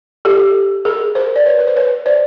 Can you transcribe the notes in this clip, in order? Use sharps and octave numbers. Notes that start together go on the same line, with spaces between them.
G4 A4
G#4 A#4
A#4 C5
D5
B4 C#5
B4
C5
B4 C#5
C5 D5